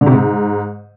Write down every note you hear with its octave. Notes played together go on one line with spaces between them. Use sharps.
D3
C3
G#2